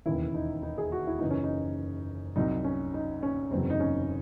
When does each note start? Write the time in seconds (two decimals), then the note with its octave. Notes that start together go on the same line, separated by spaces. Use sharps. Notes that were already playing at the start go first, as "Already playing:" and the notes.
0.06 E1 D#2 C#3 E3 E4
0.34 D#4
0.63 D#4
0.78 G#4
0.92 F#4
1.07 E4
1.19 F#1 F#2 E3 D#4
1.30 C#4
1.44 D#4
2.36 C2 C3 F#3 D#4
2.64 C#4
2.94 D#4
3.23 C#4
3.51 F#1 E2 C3 F#3 C4
3.70 D#4
3.80 C#4